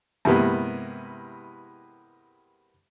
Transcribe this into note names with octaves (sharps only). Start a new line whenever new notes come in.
G2 C3 E3 G#3 A#3 B3